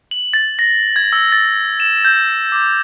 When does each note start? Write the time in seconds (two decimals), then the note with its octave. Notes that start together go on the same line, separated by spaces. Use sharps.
0.11 F#7
0.34 A6
0.59 A#6
0.96 G#6
1.13 E6
1.32 A6
1.80 E7
2.05 G6
2.52 D6